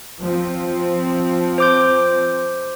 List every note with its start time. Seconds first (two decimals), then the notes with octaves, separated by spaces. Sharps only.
0.21 F3 C4
1.58 C5 D6 G6